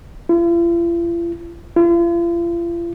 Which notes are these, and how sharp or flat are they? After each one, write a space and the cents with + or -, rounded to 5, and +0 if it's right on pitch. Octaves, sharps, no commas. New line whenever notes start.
F4 -45
F4 -40